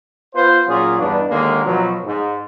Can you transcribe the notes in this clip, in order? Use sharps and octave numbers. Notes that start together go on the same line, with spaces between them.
B3 F4 B4 C5
A#2 F#3 C#4 F4 G#4
E2 G2 B3 D4 D#4
D#2 D3 G#3 A#3
B2 F3 F#3
G#2